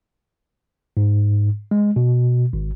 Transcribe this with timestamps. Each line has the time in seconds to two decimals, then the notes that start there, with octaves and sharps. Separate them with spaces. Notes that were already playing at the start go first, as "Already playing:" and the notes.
0.97 G#2
1.71 G#3
1.96 B2
2.53 G#1